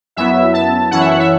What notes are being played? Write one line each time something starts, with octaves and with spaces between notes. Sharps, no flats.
F#2 F#3 B3 E4 E5
A5
F#2 E3 C#4 E4 F#5
E5
F#5
E5